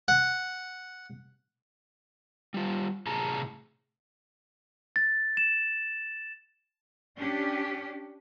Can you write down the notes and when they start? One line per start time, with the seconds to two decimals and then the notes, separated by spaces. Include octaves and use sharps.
0.08 F#5
2.54 G3 F4
3.07 A2 C3 G#4 A5 A#5
4.96 A6
5.37 E7
7.17 C#4 D4 G4